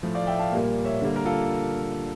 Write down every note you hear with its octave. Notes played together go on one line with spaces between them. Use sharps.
A2 F3 A3
D5 F5
E5 G5
F5 A5
A#2 G3 A#3
C#5 E5
D3 G3 A#3
A#4
F4 A4